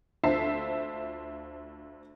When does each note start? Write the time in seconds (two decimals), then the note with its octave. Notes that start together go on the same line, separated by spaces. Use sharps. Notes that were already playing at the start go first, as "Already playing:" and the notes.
0.24 D2 F4 C5 E5 A5 C7